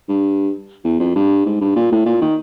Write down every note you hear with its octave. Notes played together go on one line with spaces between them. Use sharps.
G2
E2
F2
G2
G#2
G2
A#2
A2
A#2
D#3